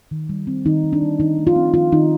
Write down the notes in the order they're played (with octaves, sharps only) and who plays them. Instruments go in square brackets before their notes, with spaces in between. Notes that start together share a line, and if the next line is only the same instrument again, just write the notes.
[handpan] D#3
G3
C4
D#3 D#4
D#3
D4
G3
D#3 D#4
A3
F4
C4
D#3 F4
D#3 D#4